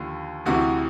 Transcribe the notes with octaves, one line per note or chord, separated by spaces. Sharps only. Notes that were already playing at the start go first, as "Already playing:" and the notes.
Already playing: D#2 D3 F3
D2 C3 E3 F#4